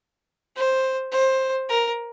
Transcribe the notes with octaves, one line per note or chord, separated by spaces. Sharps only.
C5
C5
A#4